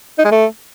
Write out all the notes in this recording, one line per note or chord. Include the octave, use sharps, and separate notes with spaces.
D#4
G#3
A3